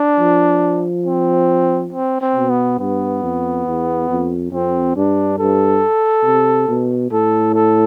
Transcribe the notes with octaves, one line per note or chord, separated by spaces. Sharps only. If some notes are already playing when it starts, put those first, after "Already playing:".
Already playing: D4
F3
C4
C4
C4
B2
B3
G2 B3
F2
E2
F2
F2 C4
G2 D4
G2 A4
C3
B2
A2 A4
A4